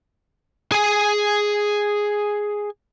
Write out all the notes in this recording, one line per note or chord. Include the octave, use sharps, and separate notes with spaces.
G#4 G#5